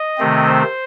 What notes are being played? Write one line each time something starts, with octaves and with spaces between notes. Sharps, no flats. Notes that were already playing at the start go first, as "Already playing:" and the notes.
Already playing: D#5
C3 D#3 A3 C4
C5